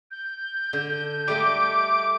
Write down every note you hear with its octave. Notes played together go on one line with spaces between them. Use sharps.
G6
D3
G3 A3 D#5 D6